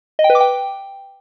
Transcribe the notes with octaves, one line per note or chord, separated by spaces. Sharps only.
D#5
G5
B4
D6
G5